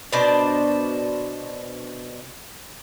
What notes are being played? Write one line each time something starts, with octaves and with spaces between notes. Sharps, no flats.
B2 D4 C5 D5